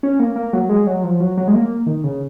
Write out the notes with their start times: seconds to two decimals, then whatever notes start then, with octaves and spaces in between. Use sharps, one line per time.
0.03 C#4
0.19 A#3
0.36 A#3
0.53 F#3
0.69 G#3
0.87 F#3
1.03 F3
1.20 F#3
1.37 F#3
1.48 G#3
1.54 A#3
1.86 D#3
2.04 C#3